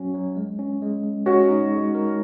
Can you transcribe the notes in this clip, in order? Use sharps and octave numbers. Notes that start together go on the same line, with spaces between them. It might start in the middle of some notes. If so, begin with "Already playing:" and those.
Already playing: F#3 C#4 F#4
F#3
G#3
C#4
G#3
G#3
G#3 C#4 F#4
D#4
G#3
A#4